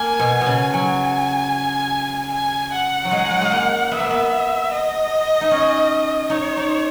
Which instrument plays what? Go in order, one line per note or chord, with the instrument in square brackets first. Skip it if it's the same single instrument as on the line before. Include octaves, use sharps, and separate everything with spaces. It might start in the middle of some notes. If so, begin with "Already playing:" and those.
Already playing: [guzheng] A#3 [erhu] G#5
[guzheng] B2
B2
C#3
[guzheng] F#3 [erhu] G#5
[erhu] G#5
F#5
[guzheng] F#3
G#3
F#3
G#3
A#3
[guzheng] B3 [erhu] E5
[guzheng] A#3
B3
[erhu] D#5
[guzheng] D#4
C#4
[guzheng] D#4 [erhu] C#5
[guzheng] D#4